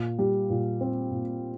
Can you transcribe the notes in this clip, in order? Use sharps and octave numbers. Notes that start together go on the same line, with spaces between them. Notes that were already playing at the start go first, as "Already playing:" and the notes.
Already playing: A#2
G3
A#2
C4
A#2